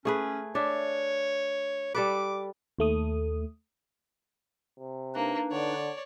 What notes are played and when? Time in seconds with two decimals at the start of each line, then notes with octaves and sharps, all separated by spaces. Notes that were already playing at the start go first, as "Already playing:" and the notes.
0.05 A3 C#4 G#4 B4
0.55 D4 C#5 E5
1.94 G3 A4 B4 D6
2.79 D#2 A3 D#6
4.79 C3
5.15 A#3 D4 D#4 B4
5.51 D3 C#5 D5